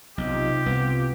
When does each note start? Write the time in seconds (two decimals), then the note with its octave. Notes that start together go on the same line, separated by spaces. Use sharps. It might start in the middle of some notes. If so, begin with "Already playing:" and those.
0.18 B1 C3 D#4 F4 G4
0.66 C2 B3